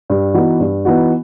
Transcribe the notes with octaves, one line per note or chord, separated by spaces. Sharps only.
G2
E3 B3 D#4 F#4
G2
E3 B3 D#4 F#4